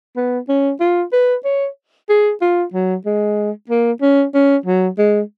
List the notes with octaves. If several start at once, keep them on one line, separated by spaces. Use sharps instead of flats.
B3
C#4
F4
B4
C#5
G#4
F4
F#3
G#3
A#3
C#4
C#4
F#3
G#3